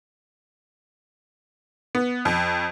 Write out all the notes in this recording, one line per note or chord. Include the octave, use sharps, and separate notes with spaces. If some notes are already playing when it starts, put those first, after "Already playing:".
B3
F2